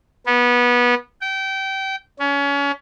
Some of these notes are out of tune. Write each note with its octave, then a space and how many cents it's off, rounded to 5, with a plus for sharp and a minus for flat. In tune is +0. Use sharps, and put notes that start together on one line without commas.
B3 -20
G5 -25
C#4 +30